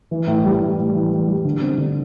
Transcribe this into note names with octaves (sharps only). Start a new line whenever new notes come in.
E3
A2
G3
A2
A2
E3
E3
G3
D3
C4
D3